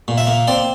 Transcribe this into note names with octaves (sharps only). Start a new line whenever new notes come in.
A#2
E5
A#3
C4 D5